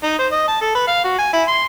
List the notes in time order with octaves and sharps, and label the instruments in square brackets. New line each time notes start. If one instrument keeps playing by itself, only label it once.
[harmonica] D#4
C5
D#5
A5
A4
B4
F5
F#4
G#5
E4
C6